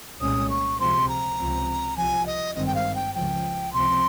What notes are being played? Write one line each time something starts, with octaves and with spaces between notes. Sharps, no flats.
C2 A#2 G#3 C#4 D#6
C#6
C#2 C3 F3 G#3 C4 C6
A#5
C#2 C3 F3 C4
C2 C3 F3 G#5
D#5
G#1 G2 D#3 G#3 C4 D#5
G5
F5
G5
C#2 C#3 F3 G5
C#2 C3 F3 C4 C6